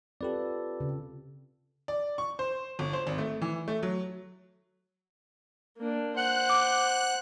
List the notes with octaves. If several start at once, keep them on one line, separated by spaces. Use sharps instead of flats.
C4 F4 G4 A4 B4 D5
C#3
D5
C#6
C5
G1
C5
G#1
A3
E3
A3
F#3
A#3 D4
C5 F#5 F#6
D6